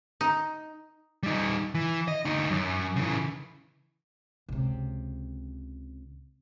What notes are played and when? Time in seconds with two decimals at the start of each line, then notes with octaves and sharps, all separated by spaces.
0.21 D#4
1.23 G3 D#4
1.75 E3
2.08 D#5
2.25 D2 D#4
2.50 F#2
2.96 C#3 E3
4.49 C#2 C3